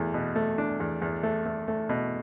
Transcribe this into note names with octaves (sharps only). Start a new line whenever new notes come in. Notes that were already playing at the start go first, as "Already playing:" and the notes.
Already playing: E2 B2 A3
B2
A3
D4
E2
E2
A3
A3
A3
B2